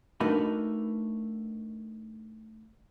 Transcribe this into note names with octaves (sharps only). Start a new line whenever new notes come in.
A3 D4 D#4 F#4 A#4 B4